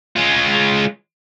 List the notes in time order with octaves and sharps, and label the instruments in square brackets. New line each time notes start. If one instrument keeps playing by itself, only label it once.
[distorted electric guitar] G#3 F4